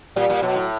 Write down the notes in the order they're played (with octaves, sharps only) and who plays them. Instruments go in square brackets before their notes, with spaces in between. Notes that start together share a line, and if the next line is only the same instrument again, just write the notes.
[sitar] A#2 [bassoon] G3
[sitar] A#2
[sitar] B2 [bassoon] F#3
[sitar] A2